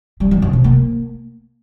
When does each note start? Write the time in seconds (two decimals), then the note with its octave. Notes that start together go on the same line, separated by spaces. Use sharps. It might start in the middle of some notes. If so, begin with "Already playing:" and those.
0.20 G3
0.31 E3
0.42 C#3
0.53 C3
0.64 A#3